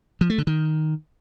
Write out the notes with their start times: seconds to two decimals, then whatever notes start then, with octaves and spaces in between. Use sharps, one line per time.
0.21 F3
0.30 A3
0.38 D3
0.47 D#3